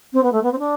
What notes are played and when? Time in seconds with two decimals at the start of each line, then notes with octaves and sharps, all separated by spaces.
0.13 C4
0.23 B3
0.32 A3
0.43 B3
0.52 C4
0.58 D4